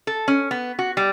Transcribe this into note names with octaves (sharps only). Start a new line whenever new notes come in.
A4
C#4
B3
F#4
G3